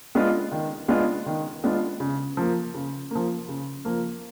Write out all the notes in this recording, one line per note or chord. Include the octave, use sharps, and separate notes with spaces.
G#3 B3 D4 F4
D#3
G#3 B3 D4 F4
D#3
G#3 B3 D4 F4
C#3
F3 A#3
C#3
F3 A#3
C#3
F3 A#3